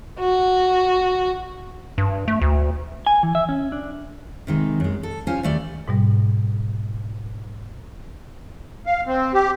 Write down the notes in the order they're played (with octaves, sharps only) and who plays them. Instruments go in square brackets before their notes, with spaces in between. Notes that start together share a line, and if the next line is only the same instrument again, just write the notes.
[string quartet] F#4
[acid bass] G2
A3
D2
[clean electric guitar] G#5
E3
E5
C#4
D4
[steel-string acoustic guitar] C3 D#3 G#3
F#2 G#3
A4
C#4 F4 C5 G#5
D#2 A3 D5
[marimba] G#2 B2 G3
[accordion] F5
C4
G4